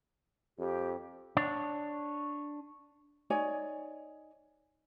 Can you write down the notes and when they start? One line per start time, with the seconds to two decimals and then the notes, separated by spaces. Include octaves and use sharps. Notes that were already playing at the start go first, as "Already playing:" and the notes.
0.59 F2 G4
1.37 D4 C#5
3.30 D#4 C#5 D5 G#5